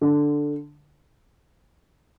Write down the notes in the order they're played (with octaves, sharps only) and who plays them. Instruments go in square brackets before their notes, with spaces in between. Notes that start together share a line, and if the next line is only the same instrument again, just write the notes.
[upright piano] D3